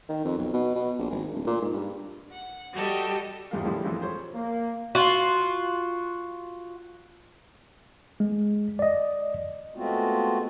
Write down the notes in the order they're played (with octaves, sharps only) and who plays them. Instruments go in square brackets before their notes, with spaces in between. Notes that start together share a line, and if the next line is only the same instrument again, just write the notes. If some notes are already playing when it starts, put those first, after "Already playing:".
[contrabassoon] D#3
F2
B1
B2
B2
A#1
G#1
D1
A#2
G#2
G2
[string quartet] F#5
G3 F#4 G4 A4 D#5
[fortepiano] E2 G#2 G3 F4 A#4 F5
A2 D3 F3 G3 E4
F2 E3 G3 G#3
F4 C5 C#5
[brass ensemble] A#3
[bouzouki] F4 F#4
[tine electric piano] G#3
D5 D#5
[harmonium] G#3 A3 B3 C4 F4 F#4